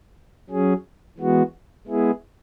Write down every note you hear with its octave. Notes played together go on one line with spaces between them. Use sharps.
F#3 C#4 G#4
E3 G#3 B3 F#4
G#3 B3 E4 G#4